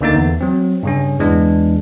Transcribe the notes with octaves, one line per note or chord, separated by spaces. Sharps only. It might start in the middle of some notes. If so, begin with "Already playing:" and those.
D2 D3 A#3 D#4 A6
E2
F#3 C4
G2 C#3 C#4
E2 E3 G#3 D4